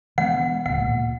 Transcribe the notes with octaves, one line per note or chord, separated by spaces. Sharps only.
E3 G#3 B3 F#5
D1 C#2 A#2 F#5
A#2